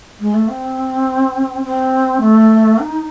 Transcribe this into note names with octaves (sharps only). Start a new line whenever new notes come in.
G#3
A3
C4
C4
A3
D#4